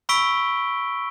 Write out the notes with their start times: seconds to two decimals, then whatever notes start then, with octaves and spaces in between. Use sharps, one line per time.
0.09 B5 C#6 E6 B6 D7 G7